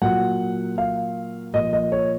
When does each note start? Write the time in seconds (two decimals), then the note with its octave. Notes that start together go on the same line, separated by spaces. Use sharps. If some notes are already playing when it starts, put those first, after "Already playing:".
0.02 A#2 F#3 F#5
0.78 F5
1.54 A#2 F3 D#5
1.73 D#5
1.92 C#5